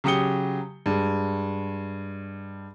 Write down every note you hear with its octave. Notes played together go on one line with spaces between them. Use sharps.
C#3 F#3 G4 D#6 C#7 G7
G2 G#3